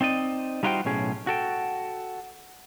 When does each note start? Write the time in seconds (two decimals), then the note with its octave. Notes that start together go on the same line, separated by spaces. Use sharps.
0.01 C4 D#4 D5 D#5
0.63 G3 D#4 F4 F#4 C5 G5
0.85 B1 A2 C#4 G#4
1.27 F#4 A4 G5